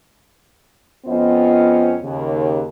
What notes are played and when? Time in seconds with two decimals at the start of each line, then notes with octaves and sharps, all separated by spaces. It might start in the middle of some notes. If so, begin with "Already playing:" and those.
1.06 F2 B3 C#4 F4 C5 D#5
2.02 D#2 C#3